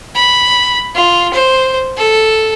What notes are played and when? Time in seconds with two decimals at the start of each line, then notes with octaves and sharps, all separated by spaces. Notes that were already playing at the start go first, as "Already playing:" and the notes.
0.16 B5
0.95 F4
1.33 C5
1.97 A4